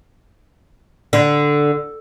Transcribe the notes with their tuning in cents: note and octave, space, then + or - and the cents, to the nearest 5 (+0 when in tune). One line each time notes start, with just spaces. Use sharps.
D3 +0